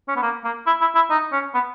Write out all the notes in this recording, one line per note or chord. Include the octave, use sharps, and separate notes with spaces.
C#4
B3
A#3
A#3
E4
E4
E4
D#4
C#4
B3